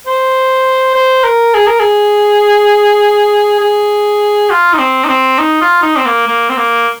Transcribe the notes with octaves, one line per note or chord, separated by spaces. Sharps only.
C5
C5
A#4
G#4
A#4
G#4
G#4
F4
D#4
C4
D#4
C4
D#4
F4
D#4
C4
A#3
A#3
C4
A#3